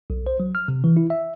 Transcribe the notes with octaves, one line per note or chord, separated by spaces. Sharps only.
B1
C5
F#3
F6
C3
E3
E4
E5